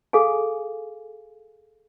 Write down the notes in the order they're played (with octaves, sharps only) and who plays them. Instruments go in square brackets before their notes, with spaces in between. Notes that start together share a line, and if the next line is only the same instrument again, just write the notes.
[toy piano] G#4 A4 F5 G#5